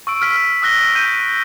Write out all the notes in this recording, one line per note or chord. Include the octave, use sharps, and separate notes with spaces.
C#6 E6 D7
F6 B6
F6
D#6 E6 F#6 A#6 G7
G6 B6 D#7